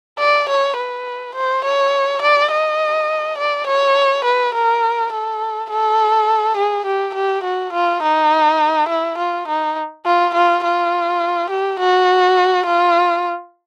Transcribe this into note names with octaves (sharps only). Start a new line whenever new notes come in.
D5
C#5
B4
C5
C#5
D5
D#5
D5
C#5
B4
A#4
A4
A4
G#4
G4
G4
F#4
F4
D#4
E4
F4
D#4
F4
F4
F4
G4
F#4
F4